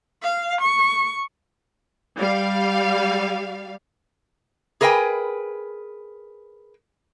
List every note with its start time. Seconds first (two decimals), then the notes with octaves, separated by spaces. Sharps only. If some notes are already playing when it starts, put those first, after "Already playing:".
0.22 F5
0.61 C#6
2.19 G3 F5
4.81 G#4 A#4 B4 D#5 G5 G#5